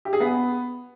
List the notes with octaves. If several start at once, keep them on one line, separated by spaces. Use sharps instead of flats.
G4
G#4
B3